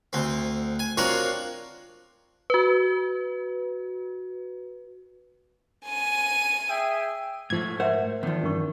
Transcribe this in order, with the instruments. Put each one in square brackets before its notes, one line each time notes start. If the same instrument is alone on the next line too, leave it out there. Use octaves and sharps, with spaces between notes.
[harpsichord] D2 C4
G#5
C4 D4 F4 F#4 A#4 C#5
[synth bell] F#4 B4
[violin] G#5 D#7
[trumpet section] G#4 E5 G5
[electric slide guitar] G#2 A3 [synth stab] F3 G#6
[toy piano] A#4 E5 [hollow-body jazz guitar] C5 F#5
[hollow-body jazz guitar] E2 F3 [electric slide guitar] D#3
[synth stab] G2 [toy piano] C#4 A#4 C#6